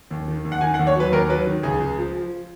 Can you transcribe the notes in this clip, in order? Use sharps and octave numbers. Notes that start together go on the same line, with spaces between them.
D#2
D#3
D#2
F#5
D#3 G#5
F#5
D#2
C#5
F#3 B4
D#2 A#4
F#3 B4
D#3
C#2 G#4
C#2
F3
F3